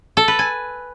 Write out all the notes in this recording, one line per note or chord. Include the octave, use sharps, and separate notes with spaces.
A4
B4
G#5